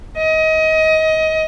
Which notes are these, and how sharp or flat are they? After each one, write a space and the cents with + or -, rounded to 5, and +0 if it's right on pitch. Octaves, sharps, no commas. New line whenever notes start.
D#5 +25